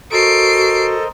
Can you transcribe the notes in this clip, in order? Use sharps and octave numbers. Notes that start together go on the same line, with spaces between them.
F#4 A4 A#4 C5 D#5 C7 D7